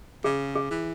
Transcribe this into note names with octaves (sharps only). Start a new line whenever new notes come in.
C#3 G#4
G#4
E3